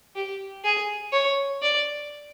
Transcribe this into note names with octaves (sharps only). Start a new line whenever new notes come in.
G4
G#4
C#5
D5